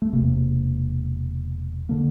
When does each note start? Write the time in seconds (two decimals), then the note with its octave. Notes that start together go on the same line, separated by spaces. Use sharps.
0.02 A3
0.13 E1 E2 C3 A#3
1.89 D3 A#3